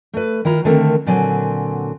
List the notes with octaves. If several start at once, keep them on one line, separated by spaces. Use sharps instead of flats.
A3 B4
D#3 E4 F4 A#5
D3 D#3 A3 C4 A#4
A#2 D3 F#3 C4 G#5